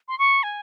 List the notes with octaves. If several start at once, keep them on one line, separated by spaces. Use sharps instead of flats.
C6
C#6
G#5